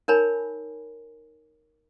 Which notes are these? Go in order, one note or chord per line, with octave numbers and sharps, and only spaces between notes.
D#4 A#4 C#5 G#5 B5